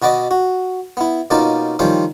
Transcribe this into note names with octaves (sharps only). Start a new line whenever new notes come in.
B2 F#4 B4 D5 D#5 D6
F#4
B3 E4
B2 A#3 C#4 D#4 F4 D5
D#3 F3 G3 C4 C#4 C5